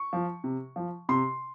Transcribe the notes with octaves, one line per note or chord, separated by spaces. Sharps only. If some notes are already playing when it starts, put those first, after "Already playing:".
Already playing: C#6
F3
C3
F3
C3 C6